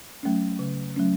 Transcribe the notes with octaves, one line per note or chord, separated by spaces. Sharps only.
F#3 A3 C#4
C#3
F#3 A3 C#4